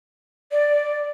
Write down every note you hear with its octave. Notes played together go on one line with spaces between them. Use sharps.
D5